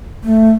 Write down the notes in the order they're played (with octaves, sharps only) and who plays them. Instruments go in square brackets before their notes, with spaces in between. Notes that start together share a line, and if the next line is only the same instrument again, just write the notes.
[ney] A3